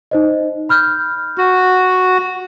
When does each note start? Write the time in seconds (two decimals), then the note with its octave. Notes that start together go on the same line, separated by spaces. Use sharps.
0.11 D#4 C5 D#5
0.69 B5 F6 G6
1.38 F#4